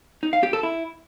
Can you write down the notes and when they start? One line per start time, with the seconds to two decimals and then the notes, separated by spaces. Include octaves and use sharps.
0.23 D#4
0.33 F5
0.43 G4
0.53 A4
0.63 E4